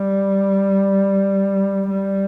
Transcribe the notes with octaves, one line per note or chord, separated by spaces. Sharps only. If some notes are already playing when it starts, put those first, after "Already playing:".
Already playing: G3
G3